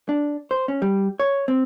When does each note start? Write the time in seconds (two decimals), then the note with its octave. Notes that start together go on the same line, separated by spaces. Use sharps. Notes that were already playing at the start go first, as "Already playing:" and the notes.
0.09 D4
0.51 C5
0.68 C#4
0.82 G3
1.20 C#5
1.48 C4